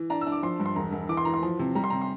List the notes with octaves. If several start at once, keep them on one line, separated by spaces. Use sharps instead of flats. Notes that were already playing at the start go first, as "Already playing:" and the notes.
Already playing: E3
D4 A#5
E6
D4
D6
F3 C6
G2
C6
E1 A#5
E1
E3 D6
C6
E3 A#5
C6
F3
C3
G3 A#5
C6
C3 A#5
C6